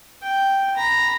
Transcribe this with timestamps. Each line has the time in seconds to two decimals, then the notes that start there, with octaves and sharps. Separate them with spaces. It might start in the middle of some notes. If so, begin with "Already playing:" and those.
0.23 G5
0.76 A#5 B5